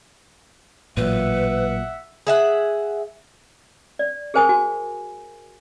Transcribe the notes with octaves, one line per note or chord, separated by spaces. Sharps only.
A1 A#2 F#3 B4 E5 F#5
G#4 E5 F#5
D5
G#4 A#4 C5 G#5 D#6
F#4 G#5